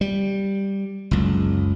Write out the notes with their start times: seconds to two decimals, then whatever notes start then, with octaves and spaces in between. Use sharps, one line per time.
0.01 G3
1.11 F#1 C#2